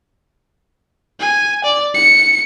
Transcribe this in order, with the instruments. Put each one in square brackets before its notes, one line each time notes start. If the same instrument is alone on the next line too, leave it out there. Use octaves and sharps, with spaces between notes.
[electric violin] G#5
D5
C#7